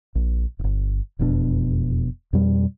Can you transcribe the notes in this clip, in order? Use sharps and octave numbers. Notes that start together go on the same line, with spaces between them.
A#1
D1 G1
E1 F2 B2 D4
F2 B2 G3